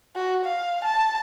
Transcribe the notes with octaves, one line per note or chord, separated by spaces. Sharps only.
F#4
F5
A5